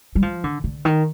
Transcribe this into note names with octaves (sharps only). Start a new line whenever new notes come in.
G3
F3
D3
D3
D#3